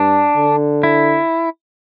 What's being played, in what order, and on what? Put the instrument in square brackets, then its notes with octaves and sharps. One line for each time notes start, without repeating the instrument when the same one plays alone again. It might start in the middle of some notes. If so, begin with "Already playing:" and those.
Already playing: [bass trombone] G2 [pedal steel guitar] D4
[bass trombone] D3
[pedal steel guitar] E4